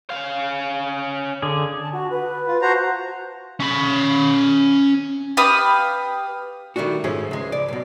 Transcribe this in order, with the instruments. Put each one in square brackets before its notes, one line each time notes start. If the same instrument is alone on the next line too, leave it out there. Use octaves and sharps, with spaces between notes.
[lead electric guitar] C#4 F5
[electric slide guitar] D3 G#4
[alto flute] A5
F#4
B4
[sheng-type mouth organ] F4
[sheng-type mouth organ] F#4 C5 A#5 [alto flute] A5
[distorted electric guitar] C#4 B5
[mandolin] G4 B4 F5 D#6
[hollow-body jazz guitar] D#3 G3 A3 D4 F#4
G#2 C#3 F3 A3 C#4 G#4
C#2 G#3
D5
B1 B2